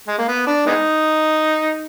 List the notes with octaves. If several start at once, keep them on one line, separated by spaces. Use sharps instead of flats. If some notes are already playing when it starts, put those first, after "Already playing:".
G#3
A#3
B3
D4
G#3 B3 D#4